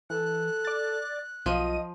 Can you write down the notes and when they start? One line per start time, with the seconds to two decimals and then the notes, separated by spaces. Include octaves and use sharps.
0.10 E3 A4 F#6
0.65 D5 A6
1.46 B1 F3 F4 D#5 D#7